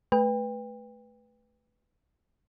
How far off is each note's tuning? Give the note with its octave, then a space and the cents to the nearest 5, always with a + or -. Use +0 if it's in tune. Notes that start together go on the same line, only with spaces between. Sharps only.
A3 -15 B4 +0 G5 +30